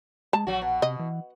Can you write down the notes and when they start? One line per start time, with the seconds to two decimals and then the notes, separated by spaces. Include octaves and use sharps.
0.33 G#3 A5
0.47 A#1 F#3 F#4
0.62 B2
0.82 C3 D#5
0.99 E3